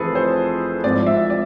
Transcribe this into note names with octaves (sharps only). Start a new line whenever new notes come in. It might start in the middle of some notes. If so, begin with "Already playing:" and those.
Already playing: F1 F2 E3 G#4 A4 B4
C5
G#1 G#2 F3 D5
E5
D5